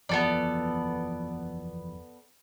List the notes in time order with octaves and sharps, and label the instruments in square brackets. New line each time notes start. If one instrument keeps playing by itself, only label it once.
[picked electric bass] F#1 E2 F3 [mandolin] B3 A4 D5